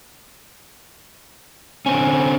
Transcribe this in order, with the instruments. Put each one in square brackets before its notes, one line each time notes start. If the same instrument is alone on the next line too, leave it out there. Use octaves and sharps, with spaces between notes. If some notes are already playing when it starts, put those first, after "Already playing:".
[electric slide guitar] D3 C4 C#4 [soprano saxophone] G#5